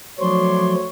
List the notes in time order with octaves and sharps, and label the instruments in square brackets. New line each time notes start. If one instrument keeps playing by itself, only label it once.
[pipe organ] F3 F#3 [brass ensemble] A3 F#4 C#5 [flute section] D4 C6 C#6